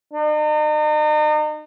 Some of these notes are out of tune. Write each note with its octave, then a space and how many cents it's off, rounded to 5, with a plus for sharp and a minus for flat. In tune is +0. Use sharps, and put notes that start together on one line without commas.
D#4 -40